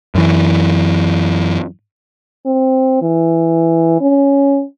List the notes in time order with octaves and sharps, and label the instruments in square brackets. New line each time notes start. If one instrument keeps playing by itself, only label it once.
[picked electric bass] F#2 E3
[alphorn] C4
E3
C#4